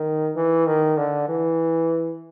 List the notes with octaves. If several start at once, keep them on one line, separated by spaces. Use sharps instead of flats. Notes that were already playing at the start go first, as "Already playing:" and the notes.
Already playing: D#3
E3
D#3
D3
E3